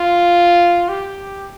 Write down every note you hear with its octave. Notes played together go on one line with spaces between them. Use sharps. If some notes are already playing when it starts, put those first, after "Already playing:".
Already playing: F4
G4